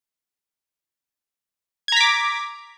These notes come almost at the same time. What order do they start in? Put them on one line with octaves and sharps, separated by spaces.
G#6 A#5 B6 D6